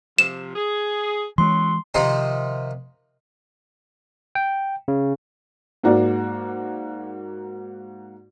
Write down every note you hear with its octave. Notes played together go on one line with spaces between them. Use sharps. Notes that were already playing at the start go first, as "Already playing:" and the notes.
C3 F3 E7
G#4
B2 E3 F#3 G#3 C#4 C6
C3 D#3 F3 D#4 C6
G5
C#3
G#2 A#3 F#4 D5